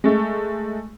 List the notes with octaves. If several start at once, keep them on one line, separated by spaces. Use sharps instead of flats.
G#3 A3